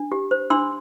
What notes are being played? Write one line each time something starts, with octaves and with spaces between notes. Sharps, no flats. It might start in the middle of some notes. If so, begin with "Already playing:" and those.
Already playing: D4
G4
C5
D4 C6 E6